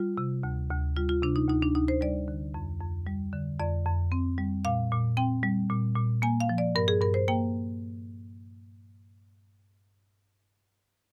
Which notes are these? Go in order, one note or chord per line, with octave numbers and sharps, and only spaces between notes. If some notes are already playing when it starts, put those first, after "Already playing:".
Already playing: G3 F4
C3
D2
D2
G3 F4
F4
C3 D4
D#4
D2 D#4
D4
D2 D#4
C5
G3 D5
D3
F2
F2
G3
D3
F2 D5
F2
C4
G3
A#2 F5
A#2
C4 G5
G3
A#2
A#2
A#3 G#5
F5
F3
D5
G2 A#4
G#4
G2 A#4
C5
A#3 G5